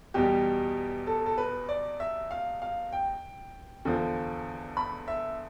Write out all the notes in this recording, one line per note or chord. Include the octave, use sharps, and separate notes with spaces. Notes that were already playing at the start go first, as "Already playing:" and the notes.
E2 B2 G3 G4
A4
A4
B4
D5
E5
F5
F5
G5
E2 D3 F3
B5
E5